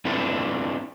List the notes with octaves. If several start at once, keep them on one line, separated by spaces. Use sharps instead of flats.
C4 D4 E4 F4 A4 B4